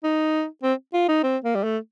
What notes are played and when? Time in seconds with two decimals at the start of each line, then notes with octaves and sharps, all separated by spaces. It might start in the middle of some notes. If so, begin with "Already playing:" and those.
0.04 D#4
0.63 C4
0.94 F4
1.09 D#4
1.23 C4
1.44 A#3
1.55 G3
1.64 A3